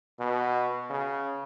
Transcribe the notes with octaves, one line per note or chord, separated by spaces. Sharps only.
B2
C#3